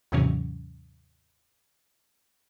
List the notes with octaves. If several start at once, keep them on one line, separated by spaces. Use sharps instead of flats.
D#2 G#2 C3 E3 F#3 C#4